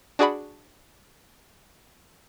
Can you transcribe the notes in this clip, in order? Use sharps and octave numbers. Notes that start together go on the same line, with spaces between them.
D4 F#4 G#4 D5 F#5 B5